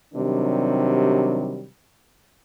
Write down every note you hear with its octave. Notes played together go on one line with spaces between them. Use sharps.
C3 D#3 F#3 G3 D4